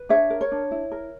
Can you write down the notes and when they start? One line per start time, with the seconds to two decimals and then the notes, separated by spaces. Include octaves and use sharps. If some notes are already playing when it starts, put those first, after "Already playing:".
Already playing: B4
0.09 D4 C#5 E5
0.30 A#4
0.41 C#5
0.52 D4
0.71 E4
0.91 A#4